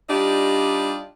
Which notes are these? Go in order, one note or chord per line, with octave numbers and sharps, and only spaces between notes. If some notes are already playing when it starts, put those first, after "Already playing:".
G3 D4 D#4 F4 G4 D5